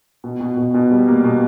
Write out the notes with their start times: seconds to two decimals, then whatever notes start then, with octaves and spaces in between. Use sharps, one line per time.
0.24 B2
0.41 B2
0.57 B2
0.74 B2
0.91 G3
1.08 A#3
1.24 B2